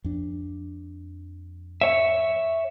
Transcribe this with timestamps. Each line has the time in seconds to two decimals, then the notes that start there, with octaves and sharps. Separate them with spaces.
0.04 F2 D4
1.81 C#5 E5